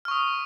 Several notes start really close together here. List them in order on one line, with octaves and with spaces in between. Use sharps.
F6 C#6 D#6